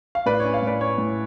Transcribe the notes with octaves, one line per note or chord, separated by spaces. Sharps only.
F5
A2 B4 D5
C#4 C#5
C#5 F5
A2 B4 D5
C#4 C#5
A2